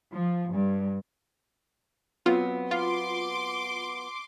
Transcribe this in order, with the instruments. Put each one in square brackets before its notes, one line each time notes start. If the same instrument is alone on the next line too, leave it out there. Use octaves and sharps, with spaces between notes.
[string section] F3
G2
[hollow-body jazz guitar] F#3 B3 C4 [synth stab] F4
[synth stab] F4 [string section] C6 D6